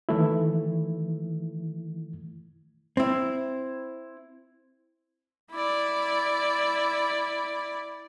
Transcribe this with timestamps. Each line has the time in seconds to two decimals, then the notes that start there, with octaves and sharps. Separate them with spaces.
0.09 D#3 E3 A3 E4
2.97 C4 E4
5.51 E4 D5